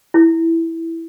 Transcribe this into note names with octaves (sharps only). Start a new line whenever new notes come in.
E4